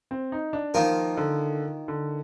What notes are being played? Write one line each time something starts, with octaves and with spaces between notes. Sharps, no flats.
C4
D#4
D4
D#3 F3 A#3 F4 A#4
D3
D3